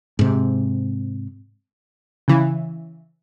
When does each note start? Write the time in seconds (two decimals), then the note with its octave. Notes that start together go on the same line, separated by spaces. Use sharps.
0.19 G#2 C3
2.28 C#3 E3